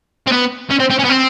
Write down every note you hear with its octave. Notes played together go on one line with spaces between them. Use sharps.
C4
B3
C#4
C4
C4
C#4
B3
C4